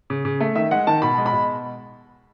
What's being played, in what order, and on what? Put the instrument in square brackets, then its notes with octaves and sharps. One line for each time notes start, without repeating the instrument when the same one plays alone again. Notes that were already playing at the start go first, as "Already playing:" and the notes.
[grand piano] C#3
C#3
A3
D#3 E5
G#3 F#5
D#3 A5
B2 B5
G#3
B5
B2